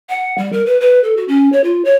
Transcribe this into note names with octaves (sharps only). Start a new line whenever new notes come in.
F#5
G3
A#4
B4
B4
A4
F#4
C#4
C#5
F4
C#5